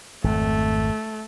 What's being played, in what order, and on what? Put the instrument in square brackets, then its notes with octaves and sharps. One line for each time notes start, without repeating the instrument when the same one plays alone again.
[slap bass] G#1 F2 [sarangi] A3